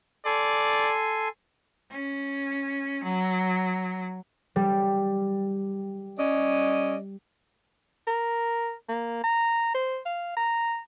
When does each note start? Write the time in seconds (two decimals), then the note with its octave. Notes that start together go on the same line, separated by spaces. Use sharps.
0.25 A4 D5 G#5 C6
1.91 C#4
3.04 F#3
4.56 G3
6.19 C#4 D5 D#5
8.07 A#4
8.89 A#3
9.24 A#5
9.75 C5
10.06 F5
10.37 A#5